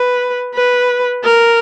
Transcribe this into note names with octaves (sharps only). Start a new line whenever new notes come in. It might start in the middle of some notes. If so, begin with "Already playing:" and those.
Already playing: B4
B4
A#4